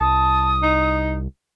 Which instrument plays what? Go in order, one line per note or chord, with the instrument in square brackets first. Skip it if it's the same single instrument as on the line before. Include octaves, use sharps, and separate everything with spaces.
[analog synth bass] C2 [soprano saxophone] A5 [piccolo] D#6
[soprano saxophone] D#4